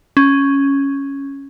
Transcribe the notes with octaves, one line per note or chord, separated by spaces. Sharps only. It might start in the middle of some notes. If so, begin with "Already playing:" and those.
C#4